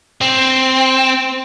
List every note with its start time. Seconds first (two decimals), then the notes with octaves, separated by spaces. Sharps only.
0.21 C4